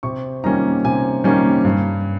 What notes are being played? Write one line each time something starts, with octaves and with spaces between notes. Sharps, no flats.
C3 C#6
D#3 G3 A#3 C#4 A#5
C3 G#5
D#3 G3 A#3 C#4
G2